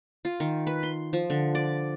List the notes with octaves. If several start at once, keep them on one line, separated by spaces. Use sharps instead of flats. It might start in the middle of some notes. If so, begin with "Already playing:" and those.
F4
D#3
B4
C6
F3
D3
D5